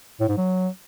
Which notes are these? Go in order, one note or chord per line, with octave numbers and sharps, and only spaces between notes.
A2
G#2
F#3